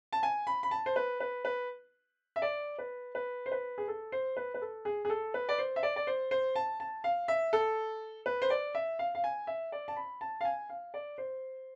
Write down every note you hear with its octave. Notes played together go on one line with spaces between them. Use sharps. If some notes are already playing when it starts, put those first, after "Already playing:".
A5
G#5
B5
B5
A5
C5
B4
B4
B4
E5
D5
B4
B4
C5
B4
G#4
A4
C5
B4
B4
A4
G#4
G#4
A4
B4
D5
C5
E5
D5
D5
C5
C5
A5
A5
F5
E5
A4
B4
C5
D5
E5
F5
F5
G#5
E5
D5
A5
B5
A5
F5
G#5
F5
D5
C5